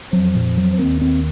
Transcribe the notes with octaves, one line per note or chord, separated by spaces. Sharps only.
F2 F3 F#3
A#2
F#3
D#2 D#3 C4
C4